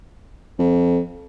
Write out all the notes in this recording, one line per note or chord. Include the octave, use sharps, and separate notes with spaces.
F2